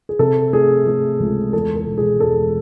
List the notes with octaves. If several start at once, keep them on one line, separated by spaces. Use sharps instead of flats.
G#4
C3 A4
A3 G#4
A3 G#4
C#2
E2 A4
A4
E1
G#4
E2 A4